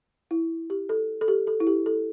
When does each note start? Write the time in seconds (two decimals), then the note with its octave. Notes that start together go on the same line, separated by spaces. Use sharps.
0.31 E4
0.70 G4
0.89 A4
1.21 A4
1.28 G4
1.47 A4
1.60 E4
1.67 G4
1.86 A4